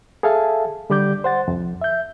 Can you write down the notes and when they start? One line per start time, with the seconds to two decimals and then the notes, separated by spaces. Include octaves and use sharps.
0.23 G#4 A4 E5 F5 G#5 A5
0.90 D3 G3 G4 D5 D6 G6
1.24 C5 F#5 A6
1.48 C2 F2
1.82 E5 G6